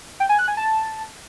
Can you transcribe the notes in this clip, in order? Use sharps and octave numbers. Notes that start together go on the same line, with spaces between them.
G5
G#5
F#6
G#5
A5